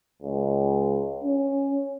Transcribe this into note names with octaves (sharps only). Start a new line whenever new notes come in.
C#2
C#4